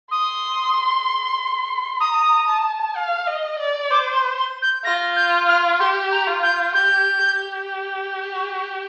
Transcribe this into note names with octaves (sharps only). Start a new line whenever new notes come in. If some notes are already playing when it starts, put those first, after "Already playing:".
C6 D#6
A#5 D#6
A5
F5
D#5
D5
C5 D6
C6
C6
G6
F4 A#6
G6
F6
G4 C6
A#5
F4
G6
G4 G6
G4